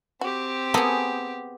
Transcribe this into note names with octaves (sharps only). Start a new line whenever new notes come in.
C4 F#4 G4
A#3 B3 G#4 A4